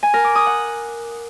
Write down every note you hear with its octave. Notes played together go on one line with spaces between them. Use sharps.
G#5
A#4
D6
D#6
F#5